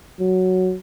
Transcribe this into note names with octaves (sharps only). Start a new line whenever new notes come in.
F#3